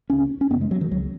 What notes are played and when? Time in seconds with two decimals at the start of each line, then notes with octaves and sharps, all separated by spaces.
0.10 C#2 C#3 C#4
0.41 C#4
0.50 F#2 C#3 B3
0.61 G#3
0.71 F#3
0.81 D#3
0.91 C#2 C#3 F#3